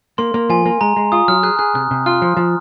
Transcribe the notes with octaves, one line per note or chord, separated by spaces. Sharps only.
A#3 C6
A#3
F3 G#5
A#3
G#3 A#5
G#3
F4 D#6
F#3 F6
G#4 F#6
G#4 F#6
C3 F#6
C3
F4 F6
F3
F3